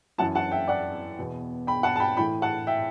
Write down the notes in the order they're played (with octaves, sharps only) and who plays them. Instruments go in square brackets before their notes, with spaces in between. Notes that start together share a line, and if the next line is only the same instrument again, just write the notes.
[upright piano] F#2 E3 F#5 A5
F#5 A5
E5 G5
D5 F#5
E2 B2
G5 B5
F#5 A5
A5
G5 B5
A2 E3 G5 B5
F#5 A5
E5 G5